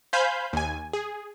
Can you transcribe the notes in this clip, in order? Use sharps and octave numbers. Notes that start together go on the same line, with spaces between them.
C5 F5 G#5 B5 G6
D#2 G#5
G#4